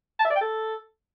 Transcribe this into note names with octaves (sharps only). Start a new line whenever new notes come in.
A5
E5
D5
G5
A4